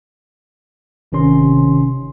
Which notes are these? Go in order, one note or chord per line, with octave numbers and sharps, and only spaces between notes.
G1 C3 D#3 C#4 C6